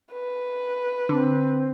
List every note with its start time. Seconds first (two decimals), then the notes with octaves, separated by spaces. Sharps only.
0.12 B4
1.09 D3 C4